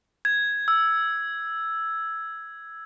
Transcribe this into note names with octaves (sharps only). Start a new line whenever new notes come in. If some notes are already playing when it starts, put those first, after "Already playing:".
G#6
E6